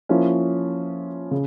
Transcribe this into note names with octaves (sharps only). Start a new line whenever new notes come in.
F3 A#3 C#4 E4
C#3